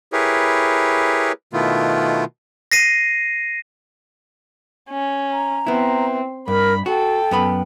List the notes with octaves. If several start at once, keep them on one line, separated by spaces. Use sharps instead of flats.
E4 G4 G#4 A#4 B4 C#5
B2 D#3 A3 B3 E4 F4
A#6 C7 D#7
C#4
A#5
B3 C4 E4
G2 A#4 B5
F#4 A4 G5
F#2 B3 B5